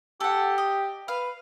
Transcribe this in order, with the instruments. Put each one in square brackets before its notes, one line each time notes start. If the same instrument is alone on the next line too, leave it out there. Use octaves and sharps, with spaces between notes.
[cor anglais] G4 [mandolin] A4 F#5
[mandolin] D#5
[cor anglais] B4 [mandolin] F5